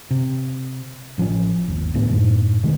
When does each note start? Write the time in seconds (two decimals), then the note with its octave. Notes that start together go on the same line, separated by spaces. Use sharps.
0.11 C3
1.18 A1 F3 F#3 C#4
1.68 G1 D#2
1.95 D2 A2 B3
2.09 F#2 A2
2.63 D1 C3 D#3 G#3